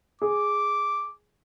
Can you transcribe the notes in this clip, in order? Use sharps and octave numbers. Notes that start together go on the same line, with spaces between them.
G#4 D6